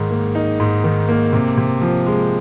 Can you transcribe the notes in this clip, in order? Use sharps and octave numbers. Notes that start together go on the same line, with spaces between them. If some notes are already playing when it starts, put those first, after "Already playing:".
Already playing: G#2 D#3 D#4
A#3
D#4
G#2
D#3
A#3
C3
C3
F3
G#3